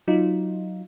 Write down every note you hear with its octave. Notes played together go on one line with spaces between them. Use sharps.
F#3 D#4 F4